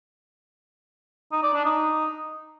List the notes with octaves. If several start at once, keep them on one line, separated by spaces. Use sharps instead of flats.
D#4
D5
D4
D#4